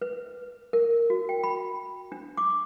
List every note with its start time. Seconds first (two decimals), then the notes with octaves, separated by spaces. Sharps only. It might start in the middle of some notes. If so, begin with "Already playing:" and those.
0.02 B4
0.73 A#4
1.10 F#4
1.29 G5
1.44 B5
2.12 D4
2.37 D6